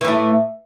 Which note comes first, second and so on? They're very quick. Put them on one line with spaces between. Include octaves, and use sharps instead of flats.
E3 A2 A3